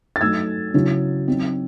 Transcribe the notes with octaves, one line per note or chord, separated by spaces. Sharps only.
A6
F#3 A3 D#4 E6 G#6
C#3 F#3 C#4 E4
F#3 C4 D#4